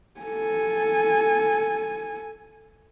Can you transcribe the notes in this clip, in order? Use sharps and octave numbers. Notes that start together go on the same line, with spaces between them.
A4 G#5